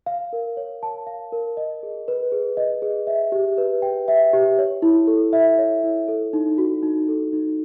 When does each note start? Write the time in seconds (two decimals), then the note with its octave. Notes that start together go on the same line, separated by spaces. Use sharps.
0.06 F5
0.33 A#4
0.57 C#5
0.83 A5
1.07 F5
1.32 A#4
1.57 D#5
1.83 G#4
2.08 B4
2.32 G#4
2.57 D#5
2.82 G#4
3.07 E5
3.32 G4
3.58 B4
3.82 G5
4.08 E5
4.33 G4
4.58 C#5
4.82 E4
5.07 A4
5.33 E5
5.58 C#5
5.84 E4
6.08 A4
6.33 D#4
6.58 F#4
6.83 D#4
7.08 A4
7.33 D#4